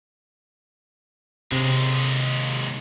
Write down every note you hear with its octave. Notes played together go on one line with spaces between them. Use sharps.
D#2 C3 G#3